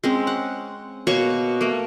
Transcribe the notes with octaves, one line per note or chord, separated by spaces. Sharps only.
G#3 C4 C#4
F#5
B2 A#3 C#5 C#6
A3 A#3